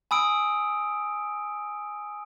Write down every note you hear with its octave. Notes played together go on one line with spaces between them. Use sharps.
G#5 B5 D#6 E6 D7